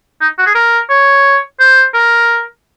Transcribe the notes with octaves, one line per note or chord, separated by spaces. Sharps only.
D#4
F#4
G#4
A#4
C#5
C5
A#4